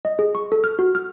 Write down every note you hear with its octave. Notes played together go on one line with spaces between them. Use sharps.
D#5
G#4
C#6
A4
F6
F#4
F6